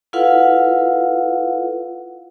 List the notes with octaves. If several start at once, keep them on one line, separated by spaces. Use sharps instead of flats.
E4 F4 A4 B4 F5 F#5